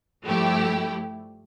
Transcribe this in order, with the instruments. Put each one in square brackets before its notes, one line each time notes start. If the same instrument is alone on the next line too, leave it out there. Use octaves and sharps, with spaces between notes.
[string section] G2 F3 A3 E4 G4